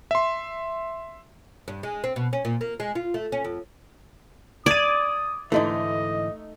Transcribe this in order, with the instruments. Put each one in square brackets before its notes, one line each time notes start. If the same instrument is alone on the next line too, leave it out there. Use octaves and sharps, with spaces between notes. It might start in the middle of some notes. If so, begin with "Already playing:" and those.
[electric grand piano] E5 C6
[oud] G2
G#3
C4
B2
C#4
A#2
A#3
G#3
F4
A3
C#4
F2
[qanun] D5 [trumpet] D#6 [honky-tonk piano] G#6 D#7
[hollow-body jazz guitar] G#2 D3 E3 [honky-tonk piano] A3 D#4 [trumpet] D#5